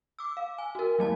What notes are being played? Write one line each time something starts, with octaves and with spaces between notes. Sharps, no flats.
D6 E6
F5
G#5
F#4 A#4
F#3 A3 A5